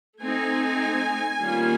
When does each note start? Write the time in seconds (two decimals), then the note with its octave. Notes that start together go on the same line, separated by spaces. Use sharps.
0.21 A3 C4 D#4 G#5
1.41 D#3 G3 A#3 C#4 F4